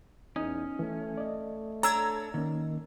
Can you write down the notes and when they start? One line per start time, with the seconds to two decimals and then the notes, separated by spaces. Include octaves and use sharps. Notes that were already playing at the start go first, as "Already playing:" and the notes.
0.36 E2 C#4 D#4 D#6
0.79 E3 A3
1.18 D5 D#5
1.83 D4 A4 C#5 A#5 E6 G#6
2.34 D#3 A#3 C#4